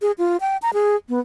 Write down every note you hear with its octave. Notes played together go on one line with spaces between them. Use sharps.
G#4
F4
G5
A#5
G#4
B3